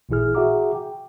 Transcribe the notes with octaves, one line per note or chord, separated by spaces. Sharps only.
A1 A#2 E3 E4 G#4 F6
F#4 G#4 E5 F#5 A#5 D6
G5